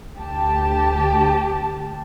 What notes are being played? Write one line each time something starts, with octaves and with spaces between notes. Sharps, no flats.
D2 G4 A5